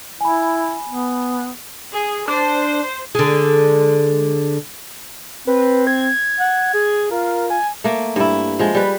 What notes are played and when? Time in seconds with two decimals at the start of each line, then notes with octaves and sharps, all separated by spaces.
0.21 E4 G#5 B5
0.89 B3
1.92 G#4
2.28 D4 C5
3.15 D3 G#3
5.47 C4 B4
5.87 G#6
6.39 F#5
6.74 G#4
7.11 F4 A#4
7.50 G#5
7.84 A3 A#3
8.16 G2 E4
8.59 F3 G#3
8.75 G3 B4